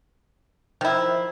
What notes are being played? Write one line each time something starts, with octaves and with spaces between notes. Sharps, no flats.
D#3 F3 E4